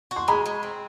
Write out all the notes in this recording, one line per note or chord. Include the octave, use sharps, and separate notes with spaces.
F#4
C6
G#3 B5
G#3
C4